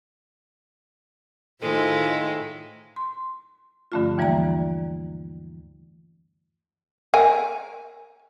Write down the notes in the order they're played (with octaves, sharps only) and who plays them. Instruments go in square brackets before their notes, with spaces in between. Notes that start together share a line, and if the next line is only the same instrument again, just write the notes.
[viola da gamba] A2 D#3 E4 [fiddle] G#3 [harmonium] F4 C5 [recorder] A4
[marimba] C6
G2 D3 F3 A3 C#4 F4
D#2 E3 G3 A#3 D5 A#5
[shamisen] A#4 G#5